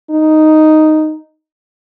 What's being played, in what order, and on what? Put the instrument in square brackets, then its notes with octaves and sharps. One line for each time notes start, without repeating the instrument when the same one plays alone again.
[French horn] D#4